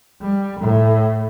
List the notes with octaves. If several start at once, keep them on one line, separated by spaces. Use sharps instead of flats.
G3
A2